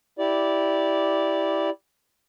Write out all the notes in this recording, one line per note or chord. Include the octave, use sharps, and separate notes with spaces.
E4 G4 D5